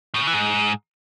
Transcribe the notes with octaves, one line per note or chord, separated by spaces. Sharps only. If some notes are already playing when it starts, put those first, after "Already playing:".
A2
C#3
E3
G#2